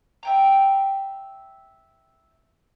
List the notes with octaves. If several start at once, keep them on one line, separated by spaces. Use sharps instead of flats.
E5 G5 A#5